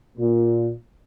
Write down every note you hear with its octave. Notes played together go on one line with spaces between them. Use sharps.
A#2